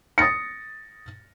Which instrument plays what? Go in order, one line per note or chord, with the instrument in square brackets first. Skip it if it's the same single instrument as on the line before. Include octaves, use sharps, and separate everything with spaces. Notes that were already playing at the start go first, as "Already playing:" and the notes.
[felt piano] D#6 A6 A#6 C#7